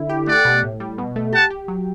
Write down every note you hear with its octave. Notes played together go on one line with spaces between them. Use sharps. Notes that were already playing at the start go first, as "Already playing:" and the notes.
Already playing: D3 E4
G4
A3 D5 F#5
B2
A2
G3
B2
A3
G4 F#5 A5
G4
F#3